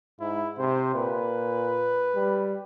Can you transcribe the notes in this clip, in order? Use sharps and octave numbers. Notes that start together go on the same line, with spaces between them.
G#2 E4
C3 C5
A#2 B4
G3